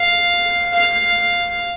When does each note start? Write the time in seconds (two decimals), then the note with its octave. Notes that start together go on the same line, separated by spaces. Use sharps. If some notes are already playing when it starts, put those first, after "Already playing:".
Already playing: F5
0.74 F5